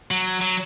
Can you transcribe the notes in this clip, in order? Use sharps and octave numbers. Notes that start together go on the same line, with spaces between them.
F#3
F#3